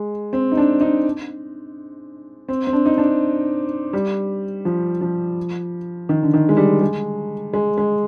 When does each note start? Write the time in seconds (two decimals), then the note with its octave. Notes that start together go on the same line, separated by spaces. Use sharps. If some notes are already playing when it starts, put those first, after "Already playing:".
Already playing: G#3
0.33 C4
0.52 D#4
0.57 D4
0.81 D#4
2.49 C4
2.67 C4
2.73 D4
2.86 D#4
2.98 D4
3.93 G3
4.65 F3
5.01 F3
6.09 D#3
6.23 D3
6.34 D#3
6.49 G#3
6.57 G3
6.81 G#3
7.53 G#3
7.78 G#3